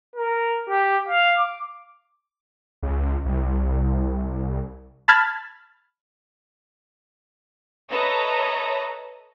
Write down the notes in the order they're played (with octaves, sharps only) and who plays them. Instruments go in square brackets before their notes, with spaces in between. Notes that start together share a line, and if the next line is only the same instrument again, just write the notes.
[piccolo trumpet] A#4
G4
F5
D6
[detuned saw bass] C#2
C2
[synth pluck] A5 B5 F6 G#6 A6
[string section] A4 B4 C#5 D#5 E5 A#5